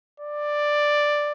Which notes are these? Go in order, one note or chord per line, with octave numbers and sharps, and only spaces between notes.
D5